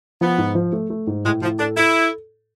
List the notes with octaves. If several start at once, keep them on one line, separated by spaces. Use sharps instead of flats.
F3 B3
G#2
F3
A3
A3
G#2
A2 G#3
A2 F3
D4 A4
E4 A4